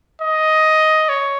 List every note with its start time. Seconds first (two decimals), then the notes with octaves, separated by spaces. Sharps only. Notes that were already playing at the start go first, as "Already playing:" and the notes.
0.22 D#5
1.09 C#5